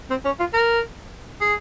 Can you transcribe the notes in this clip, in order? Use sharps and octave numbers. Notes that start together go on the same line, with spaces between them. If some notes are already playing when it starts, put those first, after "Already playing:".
C4
C#4
F4
A#4
G#4